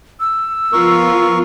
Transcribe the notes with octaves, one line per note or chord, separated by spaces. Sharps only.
E6
F3 B3 F4 A#4 C#6